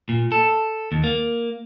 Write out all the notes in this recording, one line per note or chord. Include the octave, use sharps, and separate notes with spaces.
A#2
A4
D#2
A#3